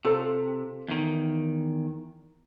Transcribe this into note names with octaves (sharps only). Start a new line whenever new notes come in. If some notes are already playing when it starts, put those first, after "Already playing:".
C3 F4 A4 C5
E2 D#3